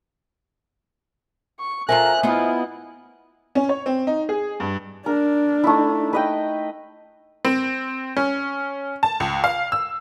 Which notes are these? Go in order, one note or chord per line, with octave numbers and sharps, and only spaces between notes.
C#6
F4 A4 A#4 C5 E5 G#5 A#5 F#6
B3 E4 F4 D#5
C#4
C#5
C4
D#4
G#4
G2
D4 A#4
A3 D#4 E4
B4 D#5 G5
C4
C#4
A5
C#2
F5
E6